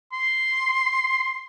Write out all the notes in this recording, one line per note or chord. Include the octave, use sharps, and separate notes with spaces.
C6